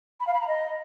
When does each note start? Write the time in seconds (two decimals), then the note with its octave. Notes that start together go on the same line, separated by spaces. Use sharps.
0.20 B5
0.27 F5
0.34 B5
0.41 A#5
0.48 D#5